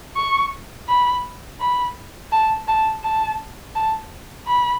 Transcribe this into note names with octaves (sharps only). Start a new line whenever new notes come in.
C#6
B5
B5
A5
A5
A5
A5
B5